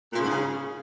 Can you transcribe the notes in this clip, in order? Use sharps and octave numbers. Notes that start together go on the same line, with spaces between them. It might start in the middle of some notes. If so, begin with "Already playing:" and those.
A#2
C#3
G#2
C#3